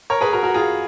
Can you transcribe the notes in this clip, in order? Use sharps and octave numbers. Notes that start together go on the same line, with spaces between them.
A#4 C#5
G#4 B4
F#4 A#4
F#4 A#4
F4 G#4